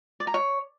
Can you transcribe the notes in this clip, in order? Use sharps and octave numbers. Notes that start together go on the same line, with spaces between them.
D5
A#5
C#5